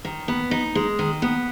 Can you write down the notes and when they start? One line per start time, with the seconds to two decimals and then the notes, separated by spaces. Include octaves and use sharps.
0.05 D#3
0.28 B3
0.51 D#4
0.75 G#3
0.99 D#3
1.22 B3